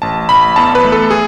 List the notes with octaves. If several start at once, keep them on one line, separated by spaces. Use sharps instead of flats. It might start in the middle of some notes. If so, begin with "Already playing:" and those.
A1 A5
A1 B5
E2 A5
B4
A3
A4
G#4